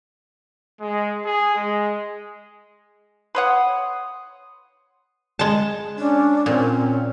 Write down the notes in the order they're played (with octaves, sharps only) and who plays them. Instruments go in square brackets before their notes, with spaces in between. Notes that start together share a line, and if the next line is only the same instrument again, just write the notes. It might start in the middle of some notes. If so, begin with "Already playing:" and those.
[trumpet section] G#3
G#4
G#3
[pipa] B4 C#5 F#5 [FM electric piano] C6 D#6
[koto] G#3 A5
[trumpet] C#4 [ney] D4
[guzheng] A#2 [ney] C4 [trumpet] C#4